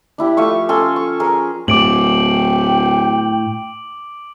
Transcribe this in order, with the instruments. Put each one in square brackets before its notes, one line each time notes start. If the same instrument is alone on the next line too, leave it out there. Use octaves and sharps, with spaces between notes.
[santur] D4 E4 G4
F3 A3 F5 C#6
C#4 A4 G#5 C6
C#6
C#4 G#4 A#4
[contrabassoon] D1 [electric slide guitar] A2 [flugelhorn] G5 [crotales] D6 D7 F#7